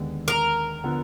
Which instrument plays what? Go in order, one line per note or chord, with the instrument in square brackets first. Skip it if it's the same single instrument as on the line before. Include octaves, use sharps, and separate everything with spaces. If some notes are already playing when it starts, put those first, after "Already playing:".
Already playing: [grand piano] D#2 D3 G#3 B3
[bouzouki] A#4
[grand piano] D3 F3 B3